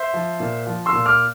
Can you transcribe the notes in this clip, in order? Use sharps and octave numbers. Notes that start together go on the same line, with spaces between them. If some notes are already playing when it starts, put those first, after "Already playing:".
Already playing: C5 E5
F3
A#2
F3
C6 E6
A#2
D6 F6